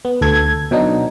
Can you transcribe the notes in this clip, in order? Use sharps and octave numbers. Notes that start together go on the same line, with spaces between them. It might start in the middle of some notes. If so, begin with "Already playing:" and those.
B3
D2 A4 G#6
B2 F#3 D4 D#4